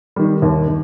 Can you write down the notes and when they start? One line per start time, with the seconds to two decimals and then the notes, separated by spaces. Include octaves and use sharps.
0.16 D#3 G3
0.42 D#2
0.67 D#3